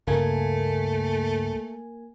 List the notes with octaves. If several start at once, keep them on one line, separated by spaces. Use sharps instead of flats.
C#2 G2 C#3 A3 A#3 G#5